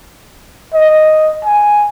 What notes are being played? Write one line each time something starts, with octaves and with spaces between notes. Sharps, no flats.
D#5
G#5